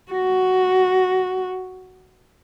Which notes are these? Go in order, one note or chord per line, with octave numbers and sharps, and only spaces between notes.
F#4